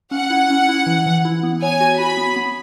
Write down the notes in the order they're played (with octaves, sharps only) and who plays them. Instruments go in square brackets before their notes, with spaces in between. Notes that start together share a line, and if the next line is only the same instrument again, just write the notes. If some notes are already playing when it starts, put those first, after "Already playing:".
[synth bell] C#4 [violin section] F#5
[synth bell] E4
C#4
E4
E3
E3
E4
B3
[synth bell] C#5 [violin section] G#5
[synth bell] F#4
[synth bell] F#4 [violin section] B5
[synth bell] B3
B3